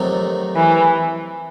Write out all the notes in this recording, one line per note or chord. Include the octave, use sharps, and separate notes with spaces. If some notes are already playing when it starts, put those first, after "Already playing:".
Already playing: F2 C3 D#3 F#3 A3
E3